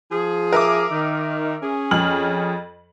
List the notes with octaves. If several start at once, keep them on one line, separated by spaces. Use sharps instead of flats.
F3 G#4
A#4 E5 D6
D#3
C#4 G#4
F2 F6 F#7